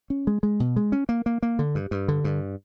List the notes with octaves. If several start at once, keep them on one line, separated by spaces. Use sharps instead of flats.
C#4
G#3
G#3
B2
G#3
C#4
A#3
A#3
A#3
D3
G2
G2
D3
G2